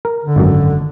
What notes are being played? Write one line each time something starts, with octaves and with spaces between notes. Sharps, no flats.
A#4
D3
G#1 F#2